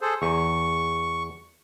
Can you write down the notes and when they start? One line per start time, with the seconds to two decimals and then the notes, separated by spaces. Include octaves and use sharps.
0.01 G#4 A4 C5
0.22 E2 C#6